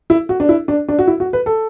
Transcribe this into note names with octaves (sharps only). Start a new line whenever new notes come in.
E4
F#4
D4
E4
D4
D4
F#4
E4
F#4
B4
A4